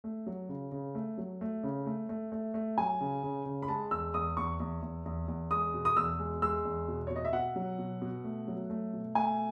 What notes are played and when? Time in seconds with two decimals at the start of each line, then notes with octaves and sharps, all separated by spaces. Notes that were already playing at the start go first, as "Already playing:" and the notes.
0.04 A3
0.26 F#3
0.49 C#3
0.72 C#3
0.95 A3
1.18 F#3
1.41 A3
1.63 C#3
1.86 A3
2.09 A3
2.32 A3
2.54 A3
2.78 F#3 G#5
3.01 C#3
3.23 C#3
3.46 C#3
3.63 B5
3.68 G#3 A5
3.91 E2 E6
4.14 E2 D#6
4.37 E2 C#6
4.60 E2
4.82 E2
5.06 E2
5.28 E2
5.51 G#3 D#6
5.74 B2
5.85 D#6
5.97 E2 E6
6.19 G#3
6.42 G#3 E6
6.65 E2
6.88 B2
7.07 B2 C#5
7.16 D#5
7.25 E5
7.33 B2 F#5
7.56 F#3
7.79 B2
8.02 B2
8.24 A3
8.47 F#3
8.70 A3
8.93 B2
9.15 A3 G#5